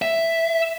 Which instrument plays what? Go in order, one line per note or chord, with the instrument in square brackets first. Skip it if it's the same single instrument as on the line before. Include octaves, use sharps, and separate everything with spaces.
[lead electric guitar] E5